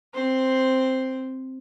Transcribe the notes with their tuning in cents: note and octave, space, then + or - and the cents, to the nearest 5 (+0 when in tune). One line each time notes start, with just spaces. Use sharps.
C4 +0 C5 +0